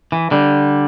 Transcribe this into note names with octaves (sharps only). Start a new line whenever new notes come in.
E3
D3 G3